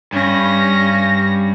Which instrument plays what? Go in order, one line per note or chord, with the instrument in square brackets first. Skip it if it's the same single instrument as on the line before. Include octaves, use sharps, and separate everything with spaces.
[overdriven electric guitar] G2 [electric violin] C#4 A#6